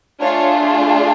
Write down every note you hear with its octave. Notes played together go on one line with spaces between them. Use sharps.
A3 D4 F4 G#4 C#5